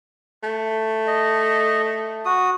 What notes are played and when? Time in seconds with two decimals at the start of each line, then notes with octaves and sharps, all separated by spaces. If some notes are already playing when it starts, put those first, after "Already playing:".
0.43 A3
1.07 D#5
2.26 F#4 D#6